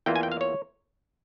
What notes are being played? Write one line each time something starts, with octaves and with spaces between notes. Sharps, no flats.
E2 E3 A#3 F4 G5
G#5
G5
F5
C#5